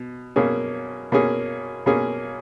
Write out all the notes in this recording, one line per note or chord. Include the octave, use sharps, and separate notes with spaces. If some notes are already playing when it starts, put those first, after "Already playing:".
Already playing: B2
B2 A#3 C#4 G#4
B2 A#3 C#4 G#4
B2 A#3 C#4 G#4